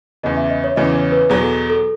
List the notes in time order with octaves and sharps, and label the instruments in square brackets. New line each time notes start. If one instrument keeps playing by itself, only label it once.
[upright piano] E2 C#3 E3 [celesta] D#5
[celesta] E5
D#5
C#5
[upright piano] E2 C#3 E3 [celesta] D#5
[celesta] C#5
B4
[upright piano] E2 B2 F#3 [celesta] G#4
[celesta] A4
A4